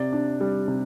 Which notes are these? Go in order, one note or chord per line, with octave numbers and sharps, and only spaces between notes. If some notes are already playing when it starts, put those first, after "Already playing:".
Already playing: C3 D5
D4
G3
C3